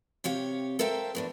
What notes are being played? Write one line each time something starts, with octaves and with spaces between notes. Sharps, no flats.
C3 G4 C#5 F5
A4 A#4 C5 E5 F5 G5
E2 A2 D4